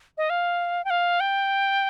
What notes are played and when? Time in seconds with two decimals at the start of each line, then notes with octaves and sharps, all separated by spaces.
0.18 D#5
0.30 F5
0.85 G5
0.90 F5
1.20 G5